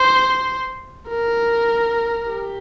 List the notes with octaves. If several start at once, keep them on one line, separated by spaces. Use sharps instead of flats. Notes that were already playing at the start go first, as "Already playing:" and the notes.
Already playing: C5
A#4
G4